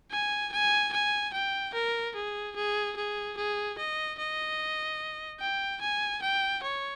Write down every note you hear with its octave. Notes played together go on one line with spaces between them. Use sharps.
G#5
G#5
G#5
G5
A#4
G#4
G#4
G#4
G#4
D#5
D#5
G5
G#5
G5
C#5